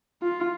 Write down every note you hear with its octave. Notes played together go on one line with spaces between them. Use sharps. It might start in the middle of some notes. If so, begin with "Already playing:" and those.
F4